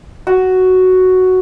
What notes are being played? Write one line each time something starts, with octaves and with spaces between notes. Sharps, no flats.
F#4